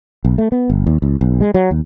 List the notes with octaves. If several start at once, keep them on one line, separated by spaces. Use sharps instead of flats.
B1
A3
B3
G1
D#2
C#2
B1
G#3
F#3
D#2